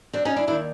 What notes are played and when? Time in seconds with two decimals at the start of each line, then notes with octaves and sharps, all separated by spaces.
0.13 C4 D4
0.25 C#4 D#4
0.36 D4 E4
0.47 D#2 D#3 D4 E4